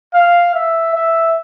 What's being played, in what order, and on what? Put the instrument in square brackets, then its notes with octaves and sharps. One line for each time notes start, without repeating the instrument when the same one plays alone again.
[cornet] F5
E5
E5